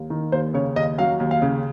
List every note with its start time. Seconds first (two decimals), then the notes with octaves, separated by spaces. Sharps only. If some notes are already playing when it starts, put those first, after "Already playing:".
Already playing: D#2
0.10 D#3
0.32 D#2 C5
0.54 C#3 C#5
0.76 D#2 D#5
0.98 F#3 F5
1.20 D#2
1.31 F5
1.42 C#3